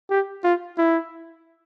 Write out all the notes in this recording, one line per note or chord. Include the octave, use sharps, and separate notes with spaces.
G4
F4
E4